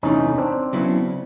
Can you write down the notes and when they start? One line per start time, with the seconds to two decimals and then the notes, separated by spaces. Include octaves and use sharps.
0.03 E2 C3 E3 A3 C#4 D#4
0.38 C4 D4
0.73 C#3 F#3 B3 E4